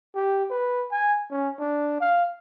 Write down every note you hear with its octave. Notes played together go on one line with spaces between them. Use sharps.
G4
B4
G#5
C#4
D4
F5